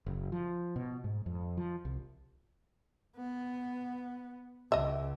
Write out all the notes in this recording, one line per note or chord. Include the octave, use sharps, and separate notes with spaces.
F#1
F3
B2
G#2
F2
F3
C2
B3
C#2 D#5 E5